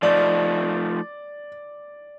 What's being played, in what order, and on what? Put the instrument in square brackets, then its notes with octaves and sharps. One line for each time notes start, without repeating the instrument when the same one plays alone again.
[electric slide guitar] F3 A3 D#4 [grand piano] D5